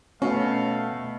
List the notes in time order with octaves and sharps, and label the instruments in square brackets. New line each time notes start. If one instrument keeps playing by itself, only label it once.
[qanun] B2 [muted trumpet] A3 [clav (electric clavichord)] C#4 [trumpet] F5